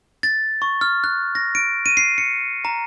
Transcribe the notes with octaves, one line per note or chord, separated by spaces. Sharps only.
A6
C#6
F6
F#6
A#6
D7
D#7
C7
C#7
A#5